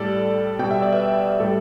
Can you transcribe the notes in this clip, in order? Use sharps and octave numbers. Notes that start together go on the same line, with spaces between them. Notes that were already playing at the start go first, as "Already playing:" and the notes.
Already playing: A2 G3 A4 D5
B2 G3 G5
E5
D5
B4 E5
A2 G3 A4 D5